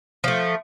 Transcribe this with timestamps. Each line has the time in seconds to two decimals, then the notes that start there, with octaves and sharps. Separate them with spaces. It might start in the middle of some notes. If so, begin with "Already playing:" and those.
0.24 F3 A3